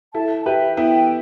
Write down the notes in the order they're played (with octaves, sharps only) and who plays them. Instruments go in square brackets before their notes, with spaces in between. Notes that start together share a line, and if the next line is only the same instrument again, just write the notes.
[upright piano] E4 A4 [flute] A5
[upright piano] G4 B4 [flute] E5
[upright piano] B3 E4 [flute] G5